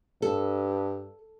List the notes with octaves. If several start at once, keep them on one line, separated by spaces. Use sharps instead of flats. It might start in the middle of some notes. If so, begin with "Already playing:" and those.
G2 A4